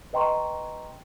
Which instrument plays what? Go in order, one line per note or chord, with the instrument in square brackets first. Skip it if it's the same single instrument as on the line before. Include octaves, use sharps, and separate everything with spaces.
[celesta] B4 D#5 G5 A#5 C6 C#6